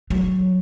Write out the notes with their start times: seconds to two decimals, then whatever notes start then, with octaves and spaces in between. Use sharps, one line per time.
0.10 F#3